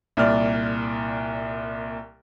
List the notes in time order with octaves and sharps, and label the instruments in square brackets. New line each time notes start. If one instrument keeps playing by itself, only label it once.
[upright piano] C2 A#2 D5 F6